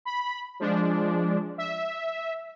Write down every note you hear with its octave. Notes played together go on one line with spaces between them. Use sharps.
B5
F3 G#3 D4
E5